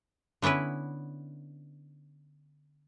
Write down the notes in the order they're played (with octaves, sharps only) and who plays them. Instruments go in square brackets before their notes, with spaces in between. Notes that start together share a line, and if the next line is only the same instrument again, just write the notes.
[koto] D3 B3 C#4 E4 B4